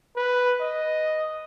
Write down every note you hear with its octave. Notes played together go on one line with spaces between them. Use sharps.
B4
D#5